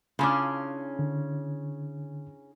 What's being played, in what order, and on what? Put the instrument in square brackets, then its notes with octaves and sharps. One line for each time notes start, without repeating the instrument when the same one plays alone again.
[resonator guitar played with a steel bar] C#3 C#4 [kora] D4 E4 F4
[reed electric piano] D3